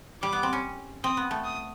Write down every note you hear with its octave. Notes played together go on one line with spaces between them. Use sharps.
G3 D6
B3
C4
C#4
C4 D#6
B3
A3
D#6